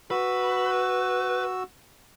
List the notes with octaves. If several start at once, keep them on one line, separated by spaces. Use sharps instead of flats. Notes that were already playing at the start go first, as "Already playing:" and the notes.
F#4 B4 E6